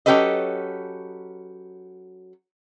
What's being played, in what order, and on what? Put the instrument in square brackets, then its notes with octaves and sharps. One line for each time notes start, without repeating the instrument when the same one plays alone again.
[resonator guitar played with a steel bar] F#3 C#4 G4 A4 B4 D#5